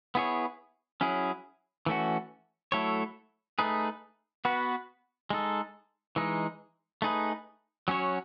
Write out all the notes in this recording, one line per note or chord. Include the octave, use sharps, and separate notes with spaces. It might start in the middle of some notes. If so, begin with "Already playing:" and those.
B3 E4 G#4 C#5
F#3 C#4 E4 G#4
E3 A3 C#4 F#4
F#3 A3 E4 A4 C#5
A3 D#4 G#4 B4
B3 F#4 B4
G#3 D#4 A4
E3 G#3 D#4
A3 D#4 G#4 B4
F#3 C#4 F#4 C#5